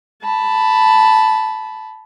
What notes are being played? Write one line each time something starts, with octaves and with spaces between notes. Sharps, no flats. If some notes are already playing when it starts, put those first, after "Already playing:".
A5 B5